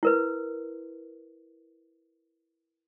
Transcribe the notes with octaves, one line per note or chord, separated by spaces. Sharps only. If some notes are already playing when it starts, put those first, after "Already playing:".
E4 A#4 B4